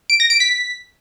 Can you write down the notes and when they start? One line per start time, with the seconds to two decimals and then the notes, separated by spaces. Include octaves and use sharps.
0.10 D7
0.20 A#6
0.30 D7
0.40 B6